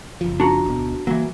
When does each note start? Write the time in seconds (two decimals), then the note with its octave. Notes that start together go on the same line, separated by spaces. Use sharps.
0.21 F#1 F3
0.40 D4 F#4 A#5
0.65 D1 B2
1.07 E3 F#3 A#3